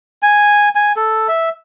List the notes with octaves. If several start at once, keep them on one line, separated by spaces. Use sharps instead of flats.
G#5
G#5
A4
E5